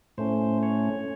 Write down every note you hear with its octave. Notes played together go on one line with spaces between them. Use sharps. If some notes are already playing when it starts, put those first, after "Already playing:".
A2 A3 C#4 C5
C#5